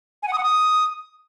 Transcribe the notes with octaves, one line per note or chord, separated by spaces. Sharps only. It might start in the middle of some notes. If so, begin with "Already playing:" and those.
G#5
F#5
D#6
F#5
D#6